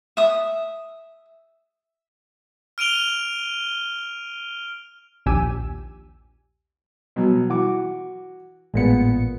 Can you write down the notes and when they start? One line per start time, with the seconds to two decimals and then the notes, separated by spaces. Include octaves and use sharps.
0.17 E5 D#6
2.78 F6 D7 D#7 F7 G7
5.26 A#1 D#2 G4 G#5 E6 D#7
7.16 B2 F#3
7.49 E3 F#4 D6
8.74 A1 A#2 G#3 B3 C#7